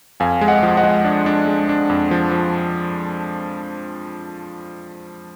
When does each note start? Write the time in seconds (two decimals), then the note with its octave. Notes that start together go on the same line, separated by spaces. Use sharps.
0.20 F2 F5 G#5
0.41 G#3
0.48 D#5 F#5
0.63 F3
0.77 D#5 F#5
0.83 G#3
1.04 D4
1.26 D4
1.47 G#3
1.69 D4
1.90 F2
2.11 F3
2.31 F3